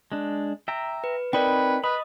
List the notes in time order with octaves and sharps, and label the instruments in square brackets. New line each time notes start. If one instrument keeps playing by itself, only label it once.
[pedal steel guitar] G#3 D4
E5 G5 A#5
[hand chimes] B4
[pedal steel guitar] C4 D#4 B5 [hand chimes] A#4 D5 G5 [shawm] B4
[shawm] B4 [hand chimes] D#5 D#6 [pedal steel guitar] B5